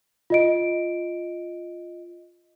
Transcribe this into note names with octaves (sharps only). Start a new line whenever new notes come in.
F4 D#5 D7